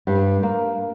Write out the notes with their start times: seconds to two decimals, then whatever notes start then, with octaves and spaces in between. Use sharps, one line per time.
0.07 G2
0.43 A#3